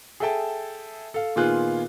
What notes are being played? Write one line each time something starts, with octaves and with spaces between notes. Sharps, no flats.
G#4 A4 E5 G5 A5
A4 F5
A#2 D#3 B3 F4 G#4 F#6